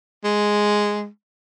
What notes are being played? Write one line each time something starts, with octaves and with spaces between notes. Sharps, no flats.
G#3